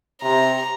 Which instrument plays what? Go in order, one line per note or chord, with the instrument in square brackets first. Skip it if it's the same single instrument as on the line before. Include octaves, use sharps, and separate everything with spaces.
[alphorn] C3 [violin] A#5